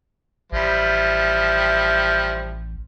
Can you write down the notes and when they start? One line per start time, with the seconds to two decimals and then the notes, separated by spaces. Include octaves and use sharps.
0.52 A1 F3 G3 E4